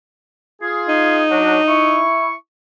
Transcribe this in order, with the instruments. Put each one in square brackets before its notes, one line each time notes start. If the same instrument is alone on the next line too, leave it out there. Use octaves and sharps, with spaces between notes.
[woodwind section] F4 G#4
[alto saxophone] D#4
[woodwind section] F#3 D4 F#4
E4 C#6